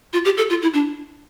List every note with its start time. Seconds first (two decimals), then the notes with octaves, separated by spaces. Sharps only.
0.13 F4
0.25 G4
0.37 A4
0.50 F4
0.62 E4
0.73 D4